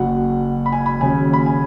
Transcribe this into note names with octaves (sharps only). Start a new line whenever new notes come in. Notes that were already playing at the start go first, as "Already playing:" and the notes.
Already playing: F#1 F#2 F#3 F#5
B5
G#5
B5
D#2 C#3 F#3 G#5
B5
G#5